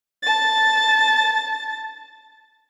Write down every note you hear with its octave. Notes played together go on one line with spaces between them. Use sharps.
A5 A6